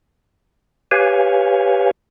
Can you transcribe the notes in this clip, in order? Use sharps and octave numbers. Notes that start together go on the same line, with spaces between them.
G4 B4 C#5 F5 G#5